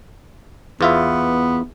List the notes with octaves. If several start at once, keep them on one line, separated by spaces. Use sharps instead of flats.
E2 B3 F4 E5